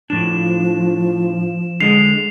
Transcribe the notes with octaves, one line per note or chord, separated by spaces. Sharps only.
A2 F3 D4 E7
D3 G#3 G#4 C7 F7